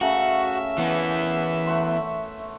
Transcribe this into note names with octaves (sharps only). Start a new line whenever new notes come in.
C#3 A3 F#4 A#4 E5
E3 B3
A3 F#5 C6